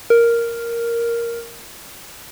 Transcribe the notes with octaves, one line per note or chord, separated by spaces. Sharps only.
A#4